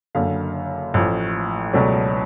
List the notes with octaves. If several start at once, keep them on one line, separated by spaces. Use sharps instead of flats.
F#1 F#2 D3 F5
A1 A2 F3
C#2 B2 F#3 A3 C#4 D5